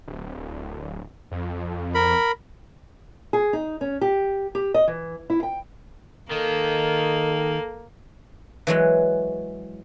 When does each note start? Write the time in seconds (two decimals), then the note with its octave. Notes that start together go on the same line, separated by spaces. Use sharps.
0.07 D1
1.31 F2
1.95 A#4 B5
3.33 G#4
3.53 D#4
3.81 C#4
4.01 G4
4.55 G4
4.74 D#5
4.88 E3
5.30 E4
5.43 G5
6.32 D#3 A#3 A4
8.67 E3 F#3 G#3